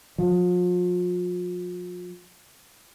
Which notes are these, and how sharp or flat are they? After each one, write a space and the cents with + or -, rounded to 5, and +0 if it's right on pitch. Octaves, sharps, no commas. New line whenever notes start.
F3 +40